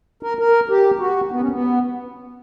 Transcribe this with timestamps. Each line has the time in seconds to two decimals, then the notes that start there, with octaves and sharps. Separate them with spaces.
0.23 A#4
0.39 A#4
0.69 G4
0.99 F#4
1.32 B3
1.41 C#4
1.51 B3